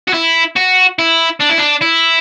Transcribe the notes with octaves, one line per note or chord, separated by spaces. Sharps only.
F#4
E4
F#4
E4
D4
E4
D4
E4